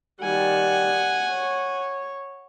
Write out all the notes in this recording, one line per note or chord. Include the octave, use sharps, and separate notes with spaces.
D#3 G3 F#5 G#5
C#5